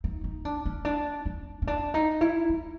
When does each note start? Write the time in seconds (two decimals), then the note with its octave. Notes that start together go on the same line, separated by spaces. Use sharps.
0.04 D#4
0.24 D#4
0.45 D4
0.65 C#4
0.85 D4
1.26 D4
1.62 C#4
1.67 D4
1.94 D#4
2.21 E4
2.49 D#4